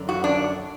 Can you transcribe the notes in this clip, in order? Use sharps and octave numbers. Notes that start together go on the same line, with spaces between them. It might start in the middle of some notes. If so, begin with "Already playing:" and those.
Already playing: F#2 D3
F#4
D4